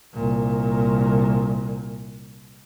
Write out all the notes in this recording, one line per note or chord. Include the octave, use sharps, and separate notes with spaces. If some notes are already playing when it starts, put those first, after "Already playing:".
C2 A#2